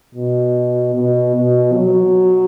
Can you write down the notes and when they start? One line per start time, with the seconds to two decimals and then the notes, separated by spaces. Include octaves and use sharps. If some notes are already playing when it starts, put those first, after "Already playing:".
0.15 B2
0.95 B2
1.35 B2
1.74 F#3